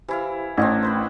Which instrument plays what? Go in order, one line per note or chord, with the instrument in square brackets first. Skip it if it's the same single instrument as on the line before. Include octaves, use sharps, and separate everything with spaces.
[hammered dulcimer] E3 E4 F5 [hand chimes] G4 C5
[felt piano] A1 [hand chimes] A3 G#6 [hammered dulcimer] C4 D4 A#4
[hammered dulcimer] E4 B4 C5